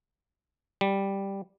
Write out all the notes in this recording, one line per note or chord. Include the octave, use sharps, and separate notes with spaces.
G3